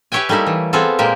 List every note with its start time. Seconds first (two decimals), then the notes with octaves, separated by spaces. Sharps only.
0.12 G4 B4 C#5 E5 G5 G#5
0.29 G3 A3 A#3 D#4 E4
0.46 E3
0.73 B3 C4 F4 G#4 A4
0.99 A#2 G#3 A#3 G4